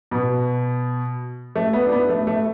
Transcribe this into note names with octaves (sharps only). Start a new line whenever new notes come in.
B2
A3
B3
D4
B3
A3
A3